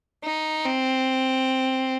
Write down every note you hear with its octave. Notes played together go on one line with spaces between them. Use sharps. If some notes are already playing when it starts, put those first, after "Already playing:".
D#4
C4